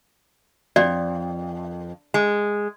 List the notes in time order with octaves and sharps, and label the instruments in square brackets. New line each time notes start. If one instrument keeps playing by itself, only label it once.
[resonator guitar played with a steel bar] F2 [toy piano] D5
[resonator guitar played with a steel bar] G#3